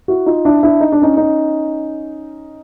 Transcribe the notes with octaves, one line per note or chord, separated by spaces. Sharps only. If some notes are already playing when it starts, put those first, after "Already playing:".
E4 F#4
D#4 F4
D4 E4
D4 E4
D#4
D4
C#4 D#4
C#4 D#4